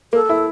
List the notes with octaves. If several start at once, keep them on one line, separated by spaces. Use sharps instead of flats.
A#3 A4
E4